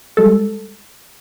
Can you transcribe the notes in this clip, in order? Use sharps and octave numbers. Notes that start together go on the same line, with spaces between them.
G3 G#3 A4